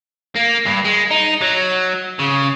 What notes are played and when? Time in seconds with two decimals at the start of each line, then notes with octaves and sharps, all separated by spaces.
0.36 A#3
0.65 G2
0.84 G#3
1.11 D#4
1.42 F#3
2.20 C#3